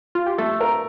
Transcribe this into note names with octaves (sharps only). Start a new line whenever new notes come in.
F4
G4
A3 A4
A#4